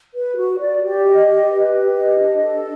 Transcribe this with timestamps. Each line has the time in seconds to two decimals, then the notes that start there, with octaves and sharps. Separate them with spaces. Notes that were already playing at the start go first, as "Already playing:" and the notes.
0.14 B4
0.36 F#4
0.59 D5
0.82 G4
1.05 D#5
1.27 G4
1.50 B4
1.73 G4
1.95 D#5
2.18 D4
2.41 A4